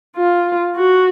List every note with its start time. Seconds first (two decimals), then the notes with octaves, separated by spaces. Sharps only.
0.17 F4
0.75 F#4